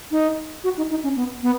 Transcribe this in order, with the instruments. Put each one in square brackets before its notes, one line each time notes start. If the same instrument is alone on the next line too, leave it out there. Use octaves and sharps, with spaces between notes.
[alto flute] D#4
F#4
D#4
D#4
C#4
B3
B3